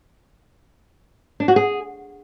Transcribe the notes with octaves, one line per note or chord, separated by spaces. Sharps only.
D4
F#4
G#4